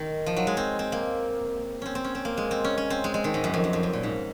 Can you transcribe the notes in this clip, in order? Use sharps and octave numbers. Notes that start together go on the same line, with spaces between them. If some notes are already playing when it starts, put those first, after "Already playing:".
Already playing: D#3
F3
F#3
G#3
C4
C4
A#3
C4 C#4
C4
C#4
C4
A#3
G#3
C4
C#4
C#4
C4
G#3
G#3
D#3
G#2
F#2
F2
F#2
F2
F#2
A#2
G#2